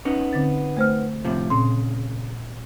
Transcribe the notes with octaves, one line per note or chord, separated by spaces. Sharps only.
B3 C#4 D#4
D3 C4 A6
A3 C5 F6
A2 C3 F3
A#2 C#3 C4 C6